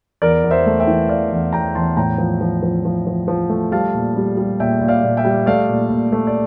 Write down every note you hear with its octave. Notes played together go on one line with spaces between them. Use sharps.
E2 A#4 D5
E2
C5 E5
A3
E5 G5
E3
E2 D5 F5
E2
E2 G5 A#5
E2 A5 C6
A2 G5 A#5
F3
F3
F3
F3
F3
F3
A3
G3 F5 A5
A#2
G3
G3
A#2 E5 G5
A#2
D5 F5
A#2
E5 G5
G3
A3 D5 F5
A#2
A#2
A3
D5